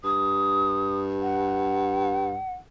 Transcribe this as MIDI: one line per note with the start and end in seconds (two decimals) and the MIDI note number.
0.04 2.39 43
0.04 0.98 87
1.22 2.53 78